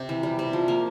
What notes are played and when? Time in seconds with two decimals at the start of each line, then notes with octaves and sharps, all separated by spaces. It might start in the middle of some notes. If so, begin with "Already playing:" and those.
Already playing: C3
0.09 E3
0.23 G3
0.39 C3
0.53 F3
0.68 A#3